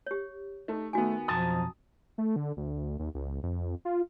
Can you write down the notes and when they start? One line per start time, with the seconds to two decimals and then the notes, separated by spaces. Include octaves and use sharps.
0.07 G4 C#5
0.68 A3 D#4
0.93 D#3 A3 B3 F#4 G#5
1.28 B1 F2 F3 A5 A#5 D#6
2.18 A3
2.36 D3
2.57 D2
2.99 D#2
3.15 C#2
3.43 F2
3.85 F4